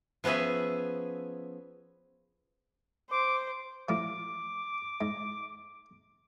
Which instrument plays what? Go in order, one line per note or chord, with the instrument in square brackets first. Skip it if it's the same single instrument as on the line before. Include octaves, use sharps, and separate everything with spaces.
[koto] F3 B3 C#4 G#4 E5
[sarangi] C5 [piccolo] D6
[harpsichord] A2 F3 [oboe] D6
[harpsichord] G#2